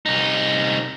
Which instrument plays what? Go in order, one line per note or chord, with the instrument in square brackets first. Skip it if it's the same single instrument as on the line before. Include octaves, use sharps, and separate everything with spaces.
[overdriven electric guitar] C2 D#4